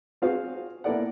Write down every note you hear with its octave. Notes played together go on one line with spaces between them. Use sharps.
C4 F4 F#4 G#4 C5 F5
A#3 B3 E4 A4 D5 F#5